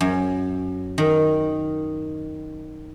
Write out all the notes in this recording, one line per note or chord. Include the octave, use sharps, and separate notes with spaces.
F#2
D#3